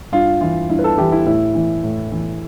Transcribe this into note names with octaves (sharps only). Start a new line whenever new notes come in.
G2 F4
E3 F4
G2 E4
B4
A4
E3 G4
E4
A2 E4
E3
A2
E3